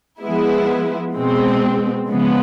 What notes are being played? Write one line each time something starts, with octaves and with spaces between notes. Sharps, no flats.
F3 G#3 B3 E4
B2 G#3 C4
C#3 F3 G#3 B3